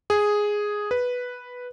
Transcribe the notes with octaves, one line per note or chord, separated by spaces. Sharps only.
G#4
B4